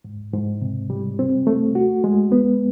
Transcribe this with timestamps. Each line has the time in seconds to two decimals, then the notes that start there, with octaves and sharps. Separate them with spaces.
0.05 G#2
0.34 G#2
0.61 C3
0.90 G3
1.19 C4
1.47 A3
1.75 F#4
2.04 G#3
2.32 B3